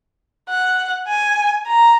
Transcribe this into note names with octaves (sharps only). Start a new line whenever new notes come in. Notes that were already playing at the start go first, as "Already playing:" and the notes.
F#5
G#5
A#5